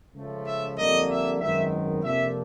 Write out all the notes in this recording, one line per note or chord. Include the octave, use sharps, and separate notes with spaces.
C#2 C#3 F3 A3
E5
F2 D3 G3 A#3 D#5
E5
G#1 F#2 D#3 G#3 B3 E5
F2 C3 F3 A#3 D4 E5